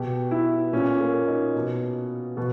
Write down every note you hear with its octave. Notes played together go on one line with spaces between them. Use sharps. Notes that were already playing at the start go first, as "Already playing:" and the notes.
Already playing: B2 G4
E4
A#2 C#4
A#3
D#4
B2
B2